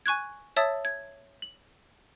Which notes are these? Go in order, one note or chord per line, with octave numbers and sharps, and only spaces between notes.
G#5 C#6 F#6 G#6
C#5 E5 A5 D#6 E6 A6
G#6
F#7